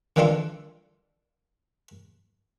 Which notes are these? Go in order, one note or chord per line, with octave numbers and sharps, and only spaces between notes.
D#3 E3 G3 D4 F4 A4